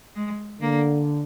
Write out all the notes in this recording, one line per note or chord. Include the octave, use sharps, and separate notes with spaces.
G#3
D3 A#3